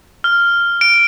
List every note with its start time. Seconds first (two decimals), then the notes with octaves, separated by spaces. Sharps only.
0.24 F6
0.81 D7